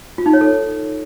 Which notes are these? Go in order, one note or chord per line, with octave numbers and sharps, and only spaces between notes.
F4
D#4
C#5
A4